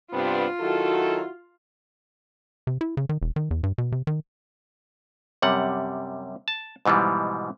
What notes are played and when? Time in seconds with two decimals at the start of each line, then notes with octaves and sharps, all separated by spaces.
0.13 G2 C3 B3 C4 D4 F4
0.60 D#3 F#3 E4 F#4 A4
2.67 C3
2.81 E4
2.97 C#3
3.09 D#3
3.21 E1
3.36 D#3
3.51 E2
3.63 G2
3.78 B2
3.92 C3
4.07 D#3
5.42 F#2 C3 G3 F#5
6.48 A5
6.85 G#2 B2 E3 F3 G3